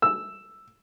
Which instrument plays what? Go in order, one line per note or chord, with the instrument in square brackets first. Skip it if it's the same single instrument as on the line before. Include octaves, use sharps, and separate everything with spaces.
[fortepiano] E6